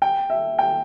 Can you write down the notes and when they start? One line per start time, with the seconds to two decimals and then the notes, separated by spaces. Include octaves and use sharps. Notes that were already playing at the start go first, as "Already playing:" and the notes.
0.02 G5
0.30 E5
0.59 G5